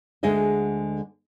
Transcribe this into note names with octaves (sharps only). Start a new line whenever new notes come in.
D2 D3 G#3 G#4 D#5 E5